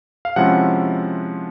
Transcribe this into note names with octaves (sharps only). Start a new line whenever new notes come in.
F5
C3 F3 G#3 C#4 E4 F#5